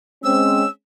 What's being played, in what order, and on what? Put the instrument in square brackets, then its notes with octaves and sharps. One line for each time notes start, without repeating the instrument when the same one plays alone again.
[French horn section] G#3 C4 C#4 [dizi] E6